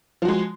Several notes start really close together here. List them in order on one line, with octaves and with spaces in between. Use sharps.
F3 F#4 G#3